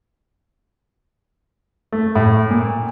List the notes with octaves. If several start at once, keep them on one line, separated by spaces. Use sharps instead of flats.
A3
A2
A#2